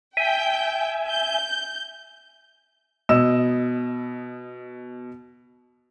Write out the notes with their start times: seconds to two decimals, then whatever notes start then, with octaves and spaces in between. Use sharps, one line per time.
0.17 E5 G5 G#5 G6
1.07 G6
3.09 B2 D#5 E6 E7